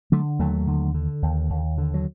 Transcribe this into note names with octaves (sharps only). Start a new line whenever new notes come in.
D3 F#3 A3
D#2 F#3 A3
D3
D3
D#2
D#2
D3
F#3